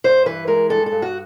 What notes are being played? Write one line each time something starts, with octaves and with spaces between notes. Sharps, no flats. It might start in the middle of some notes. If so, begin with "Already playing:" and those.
G2 C5
E3 B4
G#3 A#4
G2 A4
A4
G2
F#4